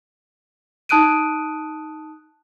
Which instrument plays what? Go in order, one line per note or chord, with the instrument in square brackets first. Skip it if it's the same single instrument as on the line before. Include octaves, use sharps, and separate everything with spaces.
[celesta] D#4 A5 D#6 F#6 D7 D#7